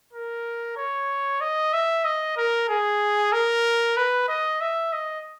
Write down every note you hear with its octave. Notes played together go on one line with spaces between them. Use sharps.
A#4
C#5
D#5
E5
D#5
A#4
G#4
A#4
B4
D#5
E5
D#5